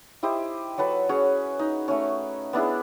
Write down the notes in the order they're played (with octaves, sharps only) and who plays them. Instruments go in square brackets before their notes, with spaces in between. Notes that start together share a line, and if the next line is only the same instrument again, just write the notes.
[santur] E4 G4 C5 D#5
F#3 A4 B4 A5
C#4 F#4 G#4
D#4
A3 C#4
B3 D4 E4 G#4